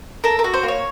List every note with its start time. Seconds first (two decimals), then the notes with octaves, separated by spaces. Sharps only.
0.24 A4 A#4
0.39 A#4
0.44 F#4
0.54 C5
0.63 A#3
0.68 C#5